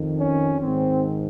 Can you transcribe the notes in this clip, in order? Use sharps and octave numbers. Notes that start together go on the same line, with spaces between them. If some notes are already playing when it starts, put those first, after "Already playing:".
Already playing: F2 D#3
C#4
G#2 D#3 C4